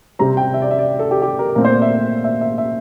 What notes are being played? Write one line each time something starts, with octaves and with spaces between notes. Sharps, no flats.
C3 G3 C4 A#5
G5
E5
D5
E5
D5
A4
G4
G4
A#4
A#2 A3 C4 A#4
C5
D5
E5
E5
E5
E5